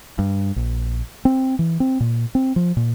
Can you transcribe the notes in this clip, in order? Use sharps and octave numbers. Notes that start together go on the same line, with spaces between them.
G2
A#1
C4
E3
C4
A#2
C4
F3
A#2